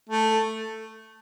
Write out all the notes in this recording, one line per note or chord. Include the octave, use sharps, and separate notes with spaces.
A3